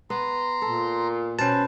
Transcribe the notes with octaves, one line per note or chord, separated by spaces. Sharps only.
B3 A#5 C6
A#2 A4
B2 C#4 B4 C5 A5